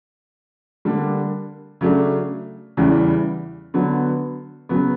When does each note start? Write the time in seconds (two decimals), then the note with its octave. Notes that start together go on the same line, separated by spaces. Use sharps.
0.85 D3 G3 A#3 D4
1.81 C#3 F#3 A3 D4
2.77 E2 C#3 E3 G3
3.74 D3 F#3 B3
4.69 C#3 F#3 B3